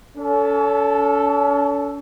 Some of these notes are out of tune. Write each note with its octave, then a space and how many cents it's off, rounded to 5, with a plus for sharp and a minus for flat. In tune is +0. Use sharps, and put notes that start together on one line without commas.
C#4 +40 A4 +0